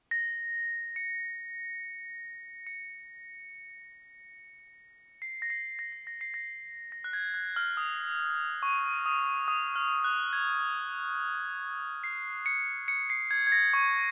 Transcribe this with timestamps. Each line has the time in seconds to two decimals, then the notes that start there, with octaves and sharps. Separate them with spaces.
0.11 A#6
0.96 C#7
2.67 C#7
5.22 C7
5.42 A#6
5.50 C7
5.79 A#6
5.92 C7
6.07 A#6
6.21 C7
6.34 A#6
6.92 A#6
7.04 F#6
7.13 G#6
7.34 F#6
7.56 F6
7.77 D#6
8.63 C#6
9.06 D#6
9.48 D#6
9.76 F6
10.04 F#6
10.33 G#6
12.04 C7
12.46 C#7
12.88 C#7
13.10 C7
13.31 G#6
13.47 G#6
13.52 A#6
13.73 C#6